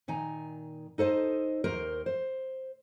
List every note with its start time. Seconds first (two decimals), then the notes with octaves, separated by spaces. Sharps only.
0.08 A#2 D#3 G#5 A#5
0.98 D#4 A4 C5 D#5
1.64 D#2 A#4 C5
2.06 C5